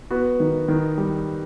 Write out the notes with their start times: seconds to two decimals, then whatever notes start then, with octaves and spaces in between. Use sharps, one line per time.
0.11 B3 F#4
0.40 D#3
0.68 D#3
0.98 G3